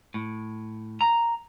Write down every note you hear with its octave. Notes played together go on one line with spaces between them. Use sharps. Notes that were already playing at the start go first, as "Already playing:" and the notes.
A2
A#5